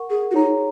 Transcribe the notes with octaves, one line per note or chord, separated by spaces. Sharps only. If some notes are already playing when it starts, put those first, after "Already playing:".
Already playing: A#4 F#5 C#6
G#4
F#4
D#4 G#4 C#5 A#5